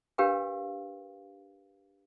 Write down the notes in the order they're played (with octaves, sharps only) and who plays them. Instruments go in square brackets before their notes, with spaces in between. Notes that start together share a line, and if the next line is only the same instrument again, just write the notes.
[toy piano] D4 G4 A#4 B4 F5 G5